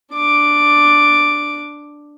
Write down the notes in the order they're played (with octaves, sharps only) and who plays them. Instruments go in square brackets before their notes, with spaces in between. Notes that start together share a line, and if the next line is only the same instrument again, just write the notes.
[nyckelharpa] D4 D6